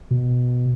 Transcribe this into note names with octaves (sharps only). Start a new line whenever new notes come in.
B2